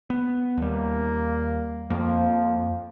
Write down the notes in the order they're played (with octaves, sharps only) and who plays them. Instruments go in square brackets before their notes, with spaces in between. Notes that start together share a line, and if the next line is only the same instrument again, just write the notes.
[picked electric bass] B3
[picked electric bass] D#2 G3 [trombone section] A#3
[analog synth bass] F2 [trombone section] F3 [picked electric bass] A#3